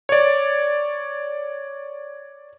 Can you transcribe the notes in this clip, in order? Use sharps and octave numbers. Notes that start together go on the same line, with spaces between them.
C#5 D5